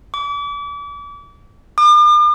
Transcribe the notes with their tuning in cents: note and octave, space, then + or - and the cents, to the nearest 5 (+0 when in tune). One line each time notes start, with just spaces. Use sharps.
D6 -35
D6 +45